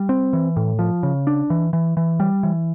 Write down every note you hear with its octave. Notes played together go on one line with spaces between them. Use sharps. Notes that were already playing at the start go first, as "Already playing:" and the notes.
Already playing: G3
C4
E3
A2
F3
C#3
D4
E3
E3
E3
G3
E3